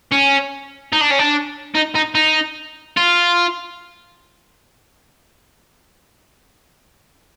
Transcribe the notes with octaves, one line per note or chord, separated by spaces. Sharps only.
C#4
D#4
D4
C#4
D4
D#4
D#4
D#4
F4